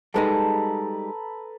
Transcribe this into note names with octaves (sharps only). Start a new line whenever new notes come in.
G3 G#3 D#4 A4 B4 A#5